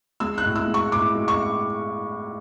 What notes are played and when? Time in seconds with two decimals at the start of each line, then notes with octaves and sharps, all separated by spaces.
0.20 G#3 E6
0.38 F#6
0.45 A2
0.56 E6
0.67 G#3
0.74 C#6
0.92 A2 D6
1.15 G#3
1.28 C#6